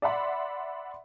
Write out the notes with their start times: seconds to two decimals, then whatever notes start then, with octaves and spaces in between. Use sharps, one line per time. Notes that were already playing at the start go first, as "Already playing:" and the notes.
0.02 D5 E5 F#5 B5 C6